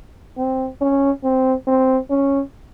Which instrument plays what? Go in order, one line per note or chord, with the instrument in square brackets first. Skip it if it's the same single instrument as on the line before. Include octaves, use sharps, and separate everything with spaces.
[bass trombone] C4
C#4
C4
C4
C#4